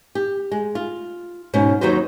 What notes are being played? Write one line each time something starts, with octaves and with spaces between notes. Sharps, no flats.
G4
G#3
F4
G#2 B2 C#4
D#2 F#3 D#4 F#4 B4 C5